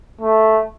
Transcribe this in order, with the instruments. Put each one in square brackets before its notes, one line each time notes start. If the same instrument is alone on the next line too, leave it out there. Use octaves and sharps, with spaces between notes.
[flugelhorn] A3